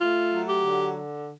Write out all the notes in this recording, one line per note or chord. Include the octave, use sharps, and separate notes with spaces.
A3 F4
F#3
G4
D3